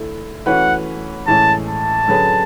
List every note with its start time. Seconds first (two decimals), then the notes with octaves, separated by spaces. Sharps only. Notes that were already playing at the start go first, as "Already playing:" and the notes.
Already playing: D3 A3 E4 A4
0.46 E3 A3 C#4 F#4 B4 F#5
1.27 A2 E3 G#3 C#4 G#4 A5
1.68 A5
2.08 D3 F#3 C#4 G#4 B4